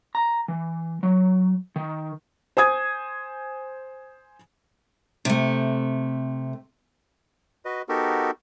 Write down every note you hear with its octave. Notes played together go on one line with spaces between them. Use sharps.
A#5
E3
F#3
D#3
C5 G#5 D#6 G#6
C3 A3
F#4 B4 D#5
B3 D#4 F#4 G4 A4 A#4